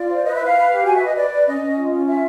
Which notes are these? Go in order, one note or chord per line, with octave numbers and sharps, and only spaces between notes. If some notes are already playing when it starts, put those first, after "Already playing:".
Already playing: F4 D5
C5
B4 D#5
E5
E4 F5
B4
G4
F#4 G#5
E5
B4
D#5
B4 D5
B4
C#4 D#5
C#4
F4
C#4
F4 E5